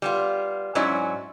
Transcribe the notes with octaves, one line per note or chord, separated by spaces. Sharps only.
G3 B3 F4
G#2 F#3 C#4 E4 D5